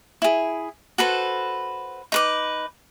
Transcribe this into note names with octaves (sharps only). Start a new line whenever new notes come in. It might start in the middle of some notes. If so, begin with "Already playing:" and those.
E4 G#4
F#4 A4 B4 C5
D#4 B4 D6